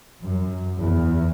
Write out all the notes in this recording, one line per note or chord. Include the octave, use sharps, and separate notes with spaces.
F#2
E2